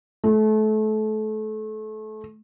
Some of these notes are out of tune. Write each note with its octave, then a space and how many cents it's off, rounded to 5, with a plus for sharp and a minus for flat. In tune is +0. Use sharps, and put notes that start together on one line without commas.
A3 -30